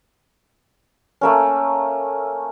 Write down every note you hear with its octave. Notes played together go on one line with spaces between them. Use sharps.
A3 A#3 C#4